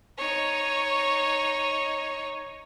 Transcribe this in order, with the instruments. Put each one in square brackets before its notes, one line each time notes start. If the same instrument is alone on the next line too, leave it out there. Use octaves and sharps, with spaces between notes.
[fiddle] D#4 C#5